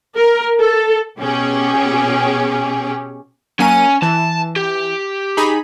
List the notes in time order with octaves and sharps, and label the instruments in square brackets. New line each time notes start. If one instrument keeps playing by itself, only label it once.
[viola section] A#4
A4
[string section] B2 C#4 G4 G#4
[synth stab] F#3 A#3 D#7 [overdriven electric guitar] C#4 G#5
[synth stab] E3 [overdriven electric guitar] A5
[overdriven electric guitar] G4
[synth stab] D#4 G#4 B5